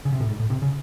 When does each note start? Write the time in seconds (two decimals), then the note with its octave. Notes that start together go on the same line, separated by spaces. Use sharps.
0.05 C#3
0.12 C3
0.21 A2
0.29 G#2
0.40 A2
0.50 C3
0.62 C#3